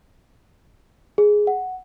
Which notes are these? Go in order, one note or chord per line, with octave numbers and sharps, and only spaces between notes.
G#4
F#5